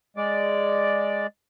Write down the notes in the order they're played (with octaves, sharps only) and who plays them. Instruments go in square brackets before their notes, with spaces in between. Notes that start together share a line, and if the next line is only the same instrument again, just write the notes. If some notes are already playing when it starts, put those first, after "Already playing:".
[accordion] G#3 D5